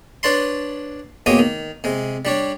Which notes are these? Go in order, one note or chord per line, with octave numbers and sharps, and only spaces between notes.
D4 B4 C#5 A5 B5 C6
B2 G#3 A#3 G4 C#5 D#6
D#3
C3 G#3
G3 D4 C#5